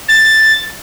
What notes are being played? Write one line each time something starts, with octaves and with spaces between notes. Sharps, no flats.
A6